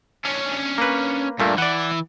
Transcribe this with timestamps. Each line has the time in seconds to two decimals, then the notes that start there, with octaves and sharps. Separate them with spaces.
0.25 C#4 D4
0.78 A#3 B4
1.40 G2 A#2 A3 A#3
1.58 E3 D5 F#5